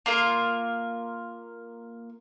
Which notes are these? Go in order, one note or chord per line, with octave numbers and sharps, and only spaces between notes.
A#3 F4 A#4